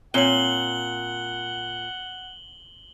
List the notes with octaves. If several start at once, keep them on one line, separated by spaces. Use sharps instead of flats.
A#2 C4 C#5 F#5 F#7 G7